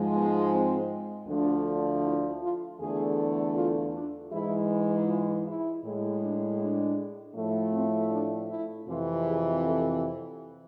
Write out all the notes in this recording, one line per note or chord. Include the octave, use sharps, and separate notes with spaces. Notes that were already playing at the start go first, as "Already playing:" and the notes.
Already playing: G#2 F3 G#3
B3
C4
D2 D3 F3 A3 D4
E4
F4
E2 D3 A3 G#4
F4
D4
G#2 E3 G#3 E4
F4
E4
A2 G#3
D4
D4
A2 F3 A3
C4
D4
E4
F2 C3 E3 F4
G#4
A4